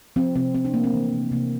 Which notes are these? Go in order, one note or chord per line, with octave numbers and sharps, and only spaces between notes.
F3 C4
C3 C4
F3 C4
D4
A3 A#3
C4
E3
C3
C3 A#3